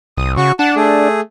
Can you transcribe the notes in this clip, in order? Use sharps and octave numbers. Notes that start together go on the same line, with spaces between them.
C2 D#6
C#3 F#4 C#6
D4 F#5 A5
A3 G#4